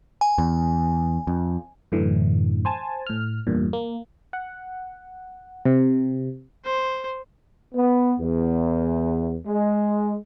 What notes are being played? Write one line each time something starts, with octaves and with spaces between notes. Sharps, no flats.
G#5
E2
F2
F#2 A2 D3 E3
C5 G#5 A5
A2 F6
E2 G2 A#2
A#3
F#5
C3
C5
B3
E2
G#3